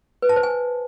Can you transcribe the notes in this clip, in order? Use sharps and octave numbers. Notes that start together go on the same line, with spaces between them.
B4
A5
C5
G#5